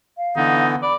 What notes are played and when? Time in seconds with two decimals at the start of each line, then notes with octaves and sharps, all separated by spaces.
0.17 F5
0.37 D3 E3 B3 D#4
0.82 D5 B5